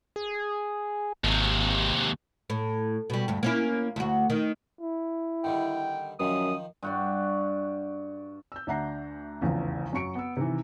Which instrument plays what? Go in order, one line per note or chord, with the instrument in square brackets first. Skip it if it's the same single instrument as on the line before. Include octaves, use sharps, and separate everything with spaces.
[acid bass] G#4
[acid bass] G#1 [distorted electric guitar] D#2 C3
[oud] A2
B2 G3
D2 G2
A#3 C#4 E4
D2 F#4
D#3
[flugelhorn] E4
[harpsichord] D3 D#3 G3 [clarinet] G5
[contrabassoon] F#2 [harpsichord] D#3 F3 [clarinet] D#6
[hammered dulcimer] G2 F#4 D5
[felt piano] E6 G6
D2 D4 E5 F#5 A#5 C7
F1 A#1 E2 C#3
F#2 F#3 C#6 C#7 D7
B3 E6
C3 D#3 E3